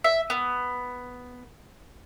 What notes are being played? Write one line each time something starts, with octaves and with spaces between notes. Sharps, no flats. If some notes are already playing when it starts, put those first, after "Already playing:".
E5
B3